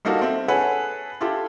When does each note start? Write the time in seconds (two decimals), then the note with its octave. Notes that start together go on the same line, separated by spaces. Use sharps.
0.05 G3 A#3 D#4 F#4 A4
0.21 C4 E5
0.48 G#4 A4 B4 C#5 F#5 G#5
1.21 E4 F4 G4 A4